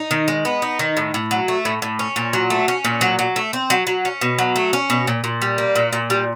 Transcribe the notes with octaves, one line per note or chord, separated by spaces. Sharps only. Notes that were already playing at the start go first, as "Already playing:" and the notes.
Already playing: D#4
D#3
G#3
B3
D#4
D#3
A2
A2
F#3
A3
A2
A2
C#4
A#2
F#3
A3
C#4
A#2
F#3
F#3
A3
C4
F#3
F#3
C#4
B2
F#3
A3
C#4
B2
A#2
A#2
G3
A#3
A#2
A#2
G3